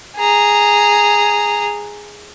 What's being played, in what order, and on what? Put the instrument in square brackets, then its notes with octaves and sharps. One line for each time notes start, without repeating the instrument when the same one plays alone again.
[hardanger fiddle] G#4 A#5